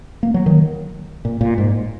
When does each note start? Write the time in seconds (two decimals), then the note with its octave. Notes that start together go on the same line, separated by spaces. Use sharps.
0.23 A#3
0.34 F#3
0.46 D#3
1.25 A#2
1.41 A#2
1.58 G#2